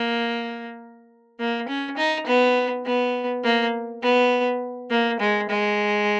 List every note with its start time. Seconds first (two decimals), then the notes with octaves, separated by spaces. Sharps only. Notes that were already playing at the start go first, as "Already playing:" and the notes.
Already playing: A#3
1.39 A#3
1.68 C#4
1.97 D#4
2.27 B3
2.85 B3
3.44 A#3
4.02 B3
4.90 A#3
5.20 G#3
5.49 G#3